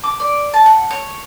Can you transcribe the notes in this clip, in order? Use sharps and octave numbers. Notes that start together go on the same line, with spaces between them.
D6
D5
A5
F#5
C#5